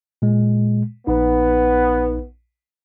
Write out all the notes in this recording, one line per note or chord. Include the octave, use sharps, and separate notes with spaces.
A#2 G#3
A#1 B3 D#4